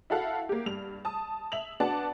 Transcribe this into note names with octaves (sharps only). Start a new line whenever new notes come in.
E4 F#4 A4 F5 F#5
A#3 G4
G2 F7
A5 D#6
E5 F7 F#7
B3 D4 F#4 D5 F#5 A5